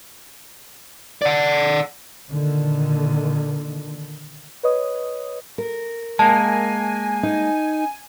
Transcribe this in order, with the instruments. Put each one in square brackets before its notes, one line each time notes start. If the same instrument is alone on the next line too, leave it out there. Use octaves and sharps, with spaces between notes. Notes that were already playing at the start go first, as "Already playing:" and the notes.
[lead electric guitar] D5 F#5
[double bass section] A#2 D3 D#3
[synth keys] B4 C#5 D#5 D#6
[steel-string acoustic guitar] A#4
[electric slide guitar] G#3 A#3 [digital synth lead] G#5 [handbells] A5
[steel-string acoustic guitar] D#4